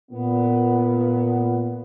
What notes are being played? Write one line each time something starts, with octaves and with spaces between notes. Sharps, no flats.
A#2 B3